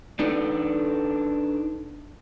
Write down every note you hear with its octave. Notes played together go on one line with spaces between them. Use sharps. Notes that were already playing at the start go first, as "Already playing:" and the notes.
D4 D#4 A4 B4 D5